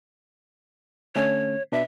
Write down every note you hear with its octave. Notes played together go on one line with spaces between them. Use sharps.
D3 A3 C#4 C#5
B2 D4 B4 E5